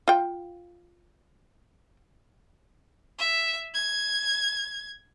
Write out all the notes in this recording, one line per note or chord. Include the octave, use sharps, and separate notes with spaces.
F4 G5
E5
G#6